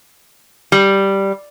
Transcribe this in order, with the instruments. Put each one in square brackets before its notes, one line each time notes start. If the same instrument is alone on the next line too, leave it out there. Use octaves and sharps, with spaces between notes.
[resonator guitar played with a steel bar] G3